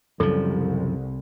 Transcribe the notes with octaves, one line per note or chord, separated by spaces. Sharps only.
C2 F#2 C#3 F3 A4